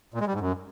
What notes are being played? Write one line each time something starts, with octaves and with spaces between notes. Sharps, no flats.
A#2
G#3
G3
G#2
F#2